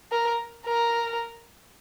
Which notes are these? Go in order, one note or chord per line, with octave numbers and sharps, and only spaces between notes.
A#4
A#4